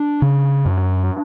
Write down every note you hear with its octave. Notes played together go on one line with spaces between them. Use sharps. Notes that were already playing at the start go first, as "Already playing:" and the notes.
Already playing: D4
C#3
F#2